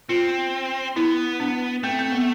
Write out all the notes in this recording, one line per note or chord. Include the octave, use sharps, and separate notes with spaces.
C4 F4
B3 E4
D4
A3 C4
C4
B3